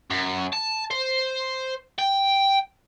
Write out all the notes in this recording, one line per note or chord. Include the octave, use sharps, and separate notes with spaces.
F#2
A5
C5
G5